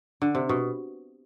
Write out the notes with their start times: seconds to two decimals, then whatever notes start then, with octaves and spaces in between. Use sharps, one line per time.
0.22 D3
0.35 C3
0.49 B2